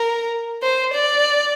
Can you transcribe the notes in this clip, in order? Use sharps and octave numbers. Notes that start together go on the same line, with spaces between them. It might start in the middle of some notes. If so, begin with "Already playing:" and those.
Already playing: A#4
C5
D5